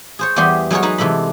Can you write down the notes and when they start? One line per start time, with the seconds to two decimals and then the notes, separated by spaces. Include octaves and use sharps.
0.19 G#4 C5 C#5
0.36 E2 G3 B3 G4 G#4 C6
0.71 F#3 G#3 G#4 A#4 C#5
0.83 D#4 F#4 B4 A#5
0.98 C3 E3 G#3 A4 B5